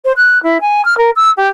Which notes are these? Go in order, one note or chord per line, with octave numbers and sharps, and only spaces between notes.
C5
F#6
E4
G#5
F6
A#4
E6
G4